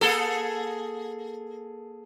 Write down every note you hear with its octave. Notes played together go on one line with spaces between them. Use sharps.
A#3 G#4 A4